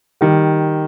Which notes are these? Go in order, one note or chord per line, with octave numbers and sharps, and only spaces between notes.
D#3 G3